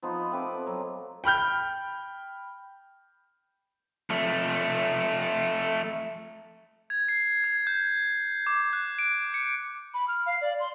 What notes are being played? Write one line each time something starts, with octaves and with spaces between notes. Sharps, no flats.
F3 B3 D#4 C5
A3 C4 B4 D6
F#3
G5 B5 F6 G6
F2 A3
G#6
C7
G#6
G6
D6
F#6
D7
C#7
B5
F6
F5
D5
C6